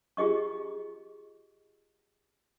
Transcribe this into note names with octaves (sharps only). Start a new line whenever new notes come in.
F4 G4 G#4 D#5 C#6